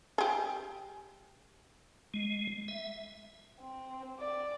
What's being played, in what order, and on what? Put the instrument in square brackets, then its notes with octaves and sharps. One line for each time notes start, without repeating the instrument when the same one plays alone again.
[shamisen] G4 G#4
[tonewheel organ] G#3
E5
[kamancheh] C4
D5